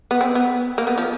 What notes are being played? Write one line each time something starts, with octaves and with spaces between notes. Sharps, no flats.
B3
C4
B3
A#3
B3
F3